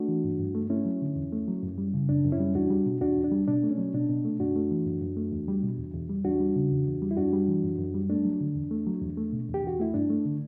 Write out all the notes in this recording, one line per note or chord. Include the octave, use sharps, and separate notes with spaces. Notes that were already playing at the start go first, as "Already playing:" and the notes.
Already playing: A3 D4 F#4
E3
G2
G2
A3
A3 C#4 E4
F#3
D3
E2
A3
F#3
F#2
G3
C#3
F#2 D4
F#2
C#4 E4
G3
E2 D4 F#4
G3
B2
E2 D4 F#4
E2
D4
G3
B2 D4
A3
C#4
F#3
B2 D4
B2
A3
F#2 D4 F#4
A3
E3
F#2
F#2
A3
E2
G3
B2
E2
E2
G3
E2 D4 F#4
G3
C#3
E2
E2
G3
E4
F#2 D4 F#4
G3
E3
F#2
F#2
G3
A3 D4
F#3
D3
E2
A3
F#3
E2
A3
B2
E2
G4
E2 F#4
A3 E4
G2 D4
A3
D3